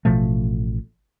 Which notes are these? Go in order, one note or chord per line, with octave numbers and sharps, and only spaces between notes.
A1 B2 F3 A3